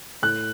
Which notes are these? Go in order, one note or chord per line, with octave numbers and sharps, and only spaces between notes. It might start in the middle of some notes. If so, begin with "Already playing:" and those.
A2 F#6